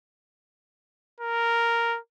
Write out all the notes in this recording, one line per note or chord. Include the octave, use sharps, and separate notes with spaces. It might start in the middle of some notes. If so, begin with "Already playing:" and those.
A#4